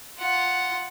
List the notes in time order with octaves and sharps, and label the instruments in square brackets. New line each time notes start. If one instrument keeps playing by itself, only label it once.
[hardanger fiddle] F4 F#5